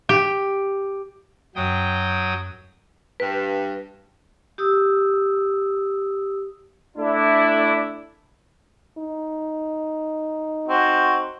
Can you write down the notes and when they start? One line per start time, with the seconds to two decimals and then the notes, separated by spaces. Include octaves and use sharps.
0.09 G4
1.56 F#2 F#3 G5 D#6
3.20 G2 B4
4.58 G4 D#6 E6
6.97 A3 D4 E4
8.98 D#4
10.68 C4 F#4